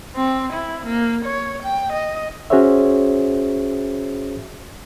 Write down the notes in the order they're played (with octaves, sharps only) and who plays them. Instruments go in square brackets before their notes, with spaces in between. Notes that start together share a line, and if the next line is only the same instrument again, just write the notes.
[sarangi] C4
E4
A#3
C#5
G5
D#5
[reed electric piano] C#4 F#4 G#4 C5 C#5 E5